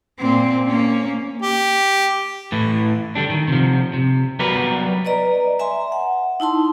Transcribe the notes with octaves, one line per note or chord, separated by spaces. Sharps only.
A#2 C4
A#3 C#4
G4
A2 E3
D3 G3 D4
D#3
C3 F3
C3
F#3 G3 B3 A#4 B4 D5
B4 D5 D#5 A#5
E5 G#5 A#5 C6
F#5
D#4 E4 A5 C6